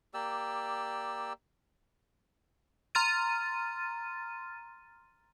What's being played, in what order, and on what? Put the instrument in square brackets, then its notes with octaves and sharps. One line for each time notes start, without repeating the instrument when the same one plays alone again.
[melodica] A#3 G4 D5 E6
[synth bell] A#5 C6 F6 A6 D#7